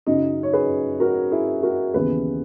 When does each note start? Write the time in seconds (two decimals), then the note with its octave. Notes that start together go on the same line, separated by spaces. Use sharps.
0.07 F#2 C#3 F#3 D#4
0.43 C#5
0.53 G#4 B4
1.00 F#4 A#4
1.31 E4 G#4
1.63 F#4 A#4
1.94 D#2 C#3 E3 B3 G#4 B4